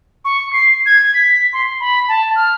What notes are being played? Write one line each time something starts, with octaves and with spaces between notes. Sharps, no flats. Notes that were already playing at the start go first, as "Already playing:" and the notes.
C#6
C7
G#6
B6
C6
B5
A5
F6